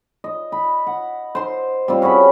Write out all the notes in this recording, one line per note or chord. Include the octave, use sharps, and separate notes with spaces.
D#5
B5
F#5
C5 C6
G3 C4 F4 C5
C#4 F#4 G#4 B5